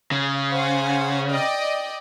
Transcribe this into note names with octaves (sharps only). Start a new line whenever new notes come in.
C#3
C5 F#5 G#5
D5 D#5 G5